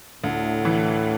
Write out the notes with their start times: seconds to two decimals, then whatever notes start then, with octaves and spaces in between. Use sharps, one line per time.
0.23 D2 A2
0.65 E3